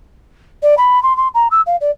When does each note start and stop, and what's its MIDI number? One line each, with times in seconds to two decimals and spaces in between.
0.62 0.75 74
0.78 1.02 83
1.03 1.16 84
1.17 1.28 84
1.34 1.48 82
1.51 1.61 88
1.66 1.76 77
1.81 1.91 74